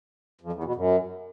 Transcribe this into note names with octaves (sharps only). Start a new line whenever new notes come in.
F2
E2
B2
F#2